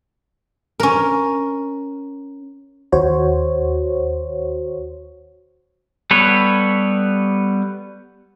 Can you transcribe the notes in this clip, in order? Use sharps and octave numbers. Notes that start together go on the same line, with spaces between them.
C#4 A#4
D#2 F#4 C5 C#5
G3 B3 A4 B4 C#5